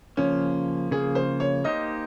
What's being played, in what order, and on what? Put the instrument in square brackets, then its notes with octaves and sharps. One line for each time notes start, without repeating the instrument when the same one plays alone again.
[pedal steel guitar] C#3 F3 A#3 [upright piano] C#4
[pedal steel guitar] C#3 F3 A#3 [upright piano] G#4
[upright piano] C5
C#5
[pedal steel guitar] A#3 D#4 G4 C5 [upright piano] D#5